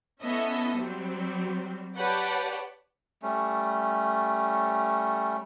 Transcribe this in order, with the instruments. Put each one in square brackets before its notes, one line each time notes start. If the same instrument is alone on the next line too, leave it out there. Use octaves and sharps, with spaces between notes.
[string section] B3 C#4 E4 A4 D#5 E5
F#3 G3 C4
G4 B4 C#5 D5 F#5 A5
[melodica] G3 A3 C#4